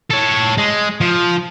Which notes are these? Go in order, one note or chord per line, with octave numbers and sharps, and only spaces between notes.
A4 C#5
G#3
F3